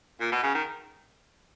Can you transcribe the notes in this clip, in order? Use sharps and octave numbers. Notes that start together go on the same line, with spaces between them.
A#2
B2
C#3
D#3